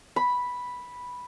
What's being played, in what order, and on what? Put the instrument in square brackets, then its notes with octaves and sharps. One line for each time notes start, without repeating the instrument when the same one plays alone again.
[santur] B5